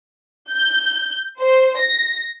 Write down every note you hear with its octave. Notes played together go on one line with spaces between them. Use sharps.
G6
C5
A#6